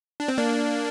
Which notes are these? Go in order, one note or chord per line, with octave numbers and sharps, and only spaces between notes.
D4
C4
A#3 D4